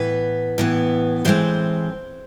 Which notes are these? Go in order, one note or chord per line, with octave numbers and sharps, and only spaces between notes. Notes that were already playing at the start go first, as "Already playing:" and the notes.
Already playing: A2 E3 B3 B4
A2 E3 B3
A2 E3 G#3 C4 C5